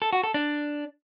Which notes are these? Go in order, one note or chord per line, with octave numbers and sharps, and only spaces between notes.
A4
F#4
A4
D4